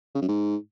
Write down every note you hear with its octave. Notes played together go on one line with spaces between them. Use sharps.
C#3
F#2
G#2